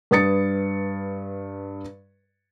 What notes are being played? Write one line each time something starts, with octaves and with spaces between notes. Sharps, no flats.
G2 B4 D#6 A6 C#7